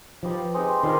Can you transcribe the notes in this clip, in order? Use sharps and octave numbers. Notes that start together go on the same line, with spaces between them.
F3 D#4 G4 B4
G#3 C4 D#4 G4
D#3 G3 D4 F4 C5